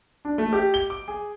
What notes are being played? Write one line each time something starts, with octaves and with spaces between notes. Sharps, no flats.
D4
A3
G4
G7
D6
G#4